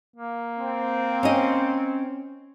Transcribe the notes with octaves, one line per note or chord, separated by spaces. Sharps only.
A#3
C4
C#4 D#5